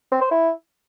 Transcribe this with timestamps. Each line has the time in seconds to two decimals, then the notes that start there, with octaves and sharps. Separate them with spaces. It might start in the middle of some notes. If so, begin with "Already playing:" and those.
0.12 C4
0.21 C5
0.31 E4